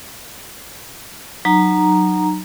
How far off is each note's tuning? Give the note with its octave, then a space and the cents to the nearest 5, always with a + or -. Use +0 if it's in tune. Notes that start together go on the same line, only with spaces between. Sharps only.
F#3 +0 D#4 -30 A#5 +0